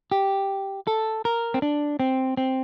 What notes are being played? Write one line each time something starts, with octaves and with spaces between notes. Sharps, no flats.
G4
A4
A#4
C4
D4
C4
C4